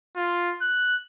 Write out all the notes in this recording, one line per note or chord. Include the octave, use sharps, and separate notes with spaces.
F4
F#6